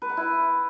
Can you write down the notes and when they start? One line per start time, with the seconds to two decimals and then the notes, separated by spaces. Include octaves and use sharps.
0.02 B4
0.09 F#5
0.17 E4